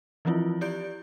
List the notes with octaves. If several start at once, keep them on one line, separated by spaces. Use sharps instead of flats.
E3 F3 C4 E4 F4
E4 G4 D5 G6 D7